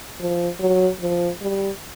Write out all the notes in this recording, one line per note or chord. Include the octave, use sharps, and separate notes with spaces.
F3
F#3
F3
G3